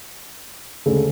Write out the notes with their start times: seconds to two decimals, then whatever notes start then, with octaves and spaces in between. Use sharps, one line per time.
0.86 D2 C#3 G#3 D4 A4